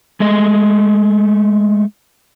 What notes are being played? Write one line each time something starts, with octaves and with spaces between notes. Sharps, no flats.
G#3 A3 D#5